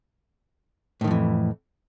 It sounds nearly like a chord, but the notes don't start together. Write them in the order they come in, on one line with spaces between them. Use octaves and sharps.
A2 D#3 F2 E3